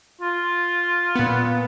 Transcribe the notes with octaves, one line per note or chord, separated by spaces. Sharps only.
F4
A#2 B3